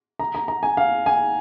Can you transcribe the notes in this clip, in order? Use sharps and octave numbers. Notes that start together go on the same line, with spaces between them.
A#5
A#5
A#5
G#5
F5
G#5